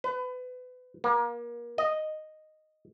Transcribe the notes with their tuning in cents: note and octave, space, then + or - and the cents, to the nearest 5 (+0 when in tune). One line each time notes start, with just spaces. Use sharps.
B4 +30
A#3 +30
D#5 -5